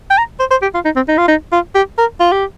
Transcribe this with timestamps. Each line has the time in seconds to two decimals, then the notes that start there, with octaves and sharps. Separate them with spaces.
0.10 G5
0.18 A#5
0.40 C5
0.51 C5
0.62 G4
0.74 F4
0.85 D#4
0.96 C4
1.08 D#4
1.18 F4
1.28 D#4
1.52 F4
1.75 G4
1.98 A#4
2.20 F4
2.32 G4